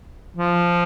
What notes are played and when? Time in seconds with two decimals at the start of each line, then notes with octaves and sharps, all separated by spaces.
0.36 F3